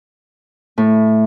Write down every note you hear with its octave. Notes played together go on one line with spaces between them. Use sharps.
A2